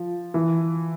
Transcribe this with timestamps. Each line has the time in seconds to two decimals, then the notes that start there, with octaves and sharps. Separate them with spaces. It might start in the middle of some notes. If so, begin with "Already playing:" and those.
Already playing: F3
0.34 E3